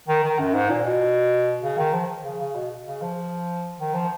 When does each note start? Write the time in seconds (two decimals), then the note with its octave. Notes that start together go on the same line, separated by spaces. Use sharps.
0.08 D#3
0.24 D#3
0.39 F#2
0.55 G#2
0.70 A#2
0.85 B2
1.63 C#3
1.78 D#3
1.94 F3
2.24 C#3
2.40 C#3
2.55 B2
2.86 C#3
3.02 F3
3.79 D#3
3.94 F3